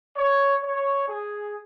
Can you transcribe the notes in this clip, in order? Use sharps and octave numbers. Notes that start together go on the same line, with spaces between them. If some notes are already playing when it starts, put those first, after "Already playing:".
C#5
C#5
G#4